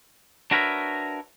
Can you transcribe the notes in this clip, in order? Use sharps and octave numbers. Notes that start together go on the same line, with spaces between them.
D4 F#4 A#4 B4 C#5 E5